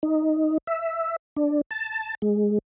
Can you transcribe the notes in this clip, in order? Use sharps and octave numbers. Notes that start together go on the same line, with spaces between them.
D#4
E5
D4
A5
G#3